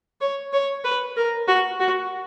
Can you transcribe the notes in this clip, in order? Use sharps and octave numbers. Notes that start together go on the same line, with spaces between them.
C#5
C#5
B4
A#4
F#4
F#4